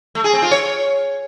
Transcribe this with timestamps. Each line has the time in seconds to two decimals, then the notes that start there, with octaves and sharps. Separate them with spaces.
0.15 A3
0.24 G#4
0.33 C4
0.42 F4
0.51 C#5